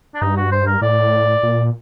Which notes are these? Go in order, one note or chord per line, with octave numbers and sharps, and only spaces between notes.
D4
G2 D#4
F#4
C5
A#4
A2 D5
A#2